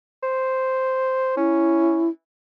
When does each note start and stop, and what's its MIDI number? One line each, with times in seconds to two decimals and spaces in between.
0.23 1.35 72
1.37 2.08 61
1.37 2.09 64